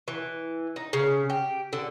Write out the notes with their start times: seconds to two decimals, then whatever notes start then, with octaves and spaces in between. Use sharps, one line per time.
0.08 E3
0.76 D#4
0.93 C#3
1.30 G4
1.73 D3